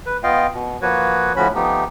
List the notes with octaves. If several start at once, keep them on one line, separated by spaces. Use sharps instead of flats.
B4
B3 F4 D#5 F5 G5
B2
F3 A#3 F#4 B4 C#5
D2 A2 F3 C#4 F#4 B5
F3 A3 B3 D#4 G4